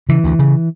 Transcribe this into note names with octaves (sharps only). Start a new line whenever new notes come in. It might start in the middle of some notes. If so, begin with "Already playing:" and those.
C#3 E3
D2
C#3